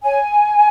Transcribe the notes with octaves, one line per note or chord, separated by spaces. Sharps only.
C#5 G#5